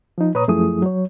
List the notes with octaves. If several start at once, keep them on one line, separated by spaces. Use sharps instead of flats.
F3 D#4
A#2 B4 C#5 A#5 D#6
F#2 F3 A3 E4 G#4 D#6
F#3 C#5